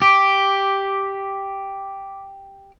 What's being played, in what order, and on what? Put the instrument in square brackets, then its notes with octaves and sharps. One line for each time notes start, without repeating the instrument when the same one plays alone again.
[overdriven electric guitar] G4 [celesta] D6 B6 D7